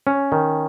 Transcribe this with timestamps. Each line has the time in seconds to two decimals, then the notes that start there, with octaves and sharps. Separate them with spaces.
0.07 C#4
0.32 D#3